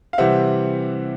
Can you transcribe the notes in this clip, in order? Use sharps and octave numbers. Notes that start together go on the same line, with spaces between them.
F5
C3 E3 G3 C4 E5 F#5